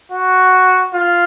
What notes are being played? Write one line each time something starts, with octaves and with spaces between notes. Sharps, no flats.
F#4
F4